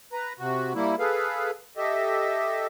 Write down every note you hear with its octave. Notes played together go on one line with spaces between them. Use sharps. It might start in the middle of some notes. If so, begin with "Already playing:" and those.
B4 A#5
C3 F#4
G3 A#3 E4
G#4 A4 B4 F5
G4 A4 D#5 E5